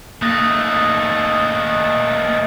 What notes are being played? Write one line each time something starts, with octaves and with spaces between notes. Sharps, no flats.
D#3 A3 A#3 D#6 F#6 A#6